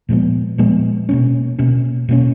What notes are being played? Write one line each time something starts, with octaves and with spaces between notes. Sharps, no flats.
A#2 F3 G#3 B3
A#2 F3 G#3 B3
B2 A#3 C#4
B2 A#3 C#4
B2 A#3 C#4